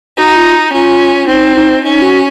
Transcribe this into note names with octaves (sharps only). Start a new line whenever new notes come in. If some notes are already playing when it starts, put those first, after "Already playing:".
D#4 F#4
F4
C#4 F4
C4 D#4
D#4
C#4 D#4
F#4